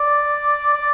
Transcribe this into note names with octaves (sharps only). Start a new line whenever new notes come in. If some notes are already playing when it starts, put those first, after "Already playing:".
Already playing: D5
D5